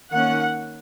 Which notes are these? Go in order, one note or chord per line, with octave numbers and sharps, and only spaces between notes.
D#3 A#3 C#4 F#5